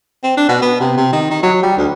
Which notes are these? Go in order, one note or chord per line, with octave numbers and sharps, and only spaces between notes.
C4
D4
B2
B3
C3
C3
D#3
D#3
F#3
G3
D2